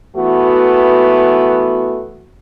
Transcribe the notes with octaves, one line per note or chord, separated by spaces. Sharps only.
E3 A3 B3 F#4